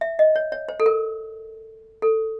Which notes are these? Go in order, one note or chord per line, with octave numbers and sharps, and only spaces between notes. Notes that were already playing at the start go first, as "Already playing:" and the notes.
E5
D#5
C#5
C#5
C5
A4
A#4
A4